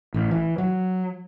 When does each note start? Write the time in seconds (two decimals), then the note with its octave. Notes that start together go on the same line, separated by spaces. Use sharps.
0.14 A1
0.31 E3
0.58 F#3